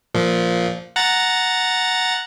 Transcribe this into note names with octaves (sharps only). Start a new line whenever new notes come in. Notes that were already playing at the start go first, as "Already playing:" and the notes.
A#2 F3
F#5 A#5 A6